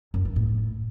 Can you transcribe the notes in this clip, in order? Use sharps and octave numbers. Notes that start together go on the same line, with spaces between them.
F#2
E3
A2